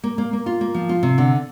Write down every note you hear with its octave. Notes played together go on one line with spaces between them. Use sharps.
A#3
A#3
A#3
F4
A#3
F3
F4
C3
D3